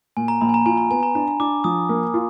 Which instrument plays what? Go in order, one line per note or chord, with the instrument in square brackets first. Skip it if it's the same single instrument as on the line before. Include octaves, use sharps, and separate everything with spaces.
[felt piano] A#2 [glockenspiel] G#5
[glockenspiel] A#5
[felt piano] A#1 [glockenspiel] B5
[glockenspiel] G#5
A#5
[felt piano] F4 [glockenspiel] G#5
[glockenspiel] A#5
[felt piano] B3 [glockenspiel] G#5
[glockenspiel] A#5
[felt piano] D4 [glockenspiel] A#5
[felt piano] D4 [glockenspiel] D6
[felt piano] F3 [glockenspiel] D#6
[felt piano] A#3
F4